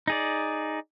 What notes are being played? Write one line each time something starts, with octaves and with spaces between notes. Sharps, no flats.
D#4 G#4 D5